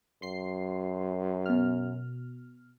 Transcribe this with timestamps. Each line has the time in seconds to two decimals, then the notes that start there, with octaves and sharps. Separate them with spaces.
0.22 F#2 C6 C7
1.46 B2 F6